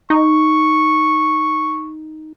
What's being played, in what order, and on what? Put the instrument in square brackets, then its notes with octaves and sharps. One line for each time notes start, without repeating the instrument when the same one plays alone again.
[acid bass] D#4 [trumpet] C#6